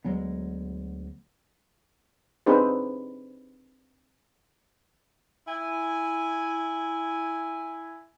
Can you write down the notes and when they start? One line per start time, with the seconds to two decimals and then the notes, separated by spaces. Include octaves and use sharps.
0.04 D2 F#3 G#3 B3
2.46 C4 D4 D#4 G#4 B4 C5
5.47 E4 G#5